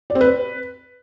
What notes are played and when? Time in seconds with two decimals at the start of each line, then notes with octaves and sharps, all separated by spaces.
0.10 D5
0.15 C4
0.21 B4